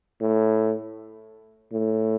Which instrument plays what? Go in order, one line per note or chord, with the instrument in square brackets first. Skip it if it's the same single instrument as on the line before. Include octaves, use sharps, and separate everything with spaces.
[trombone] A2
A2